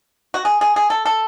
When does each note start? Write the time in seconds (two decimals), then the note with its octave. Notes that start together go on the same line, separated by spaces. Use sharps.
0.34 F#4
0.45 G#4
0.61 G#4
0.76 G#4
0.90 A4
1.05 A4